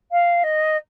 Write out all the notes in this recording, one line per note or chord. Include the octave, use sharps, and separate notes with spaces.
F5
D#5